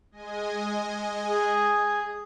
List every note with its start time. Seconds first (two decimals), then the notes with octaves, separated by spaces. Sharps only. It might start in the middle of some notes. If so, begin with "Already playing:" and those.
0.11 G#3 D#5 G#5
1.29 G#4